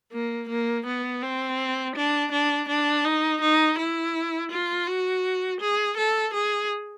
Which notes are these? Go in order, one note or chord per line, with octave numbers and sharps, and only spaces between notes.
A#3
A#3
B3
C4
D4
D4
D4
D#4
D#4
E4
F4
F#4
G#4
A4
G#4